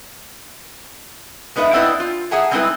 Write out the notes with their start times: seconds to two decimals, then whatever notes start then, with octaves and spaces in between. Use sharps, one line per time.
1.56 G#3 B3 D#4 B4 E5
1.73 B3 C4 E4 B4 D5 D#5
2.00 F4
2.31 G#4 E5 F#5 G#5 A#5
2.51 G3 G#3 C4 D#4 E4 B4